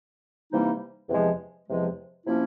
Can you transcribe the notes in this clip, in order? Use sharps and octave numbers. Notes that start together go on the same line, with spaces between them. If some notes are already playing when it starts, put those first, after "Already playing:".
C3 E3 G3 A#3 D#4
E2 C3 F3 G#3
E2 C3 F3 G#3
C3 F3 A#3 C#4 E4